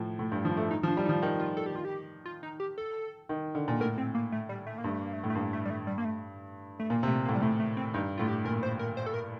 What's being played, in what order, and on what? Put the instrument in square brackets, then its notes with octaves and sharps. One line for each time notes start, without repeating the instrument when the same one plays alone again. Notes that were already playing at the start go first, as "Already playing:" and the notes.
Already playing: [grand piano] A2 F3
A2
G2
F3
A3
[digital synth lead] D#4
[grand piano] F3
[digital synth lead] D4
[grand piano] G3
[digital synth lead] D#4
[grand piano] F3
[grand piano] D#3 [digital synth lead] D#4
[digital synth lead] F4
A4
G4
F4
G4
F4
D#4
G4
A4
[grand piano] D#3
D3
A#2
[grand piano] A2 [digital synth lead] A#4
[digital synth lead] C4
A#3
A3
G3
A3
A#3
[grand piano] G2
[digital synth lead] A3
A#3
A3
[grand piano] A2
[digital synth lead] A3
[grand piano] G2 [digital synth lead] A#3
[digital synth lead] A3
G3
A3
G3
A#3
A3
A3
[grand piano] A#2 [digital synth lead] A#3
[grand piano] C3
[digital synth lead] A3
A#3
[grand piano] A2
[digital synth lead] G3
[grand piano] A2 [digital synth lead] A3
[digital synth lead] A3
C4
[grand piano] G2 [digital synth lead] D#4
[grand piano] A2 [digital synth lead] F4
[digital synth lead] G4
[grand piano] A#2 [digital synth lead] A#4
[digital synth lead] C5
A#4
C5
A4
A#4